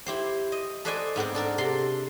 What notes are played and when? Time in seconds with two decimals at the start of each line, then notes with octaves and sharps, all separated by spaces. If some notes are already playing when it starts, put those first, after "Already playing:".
0.06 E4 G4 C5
0.52 D#5
0.85 A4 B4 C5 D5 D#5 G#5
1.16 G#2 B3 C4 C5
1.35 D4 A4 A#4
1.58 C3 A4 C6